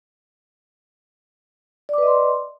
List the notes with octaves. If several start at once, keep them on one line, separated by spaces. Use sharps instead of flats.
B4 D5 D#5 C6 D6